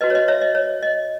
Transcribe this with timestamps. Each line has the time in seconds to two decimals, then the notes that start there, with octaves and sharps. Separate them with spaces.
0.01 F#4 B4 D#5
0.10 C#5
0.15 D#5
0.28 C#5 E5
0.41 D#5
0.55 C#5
0.83 D#5